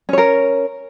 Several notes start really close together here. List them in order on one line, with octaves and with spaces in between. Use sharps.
C#4 C#5 A#4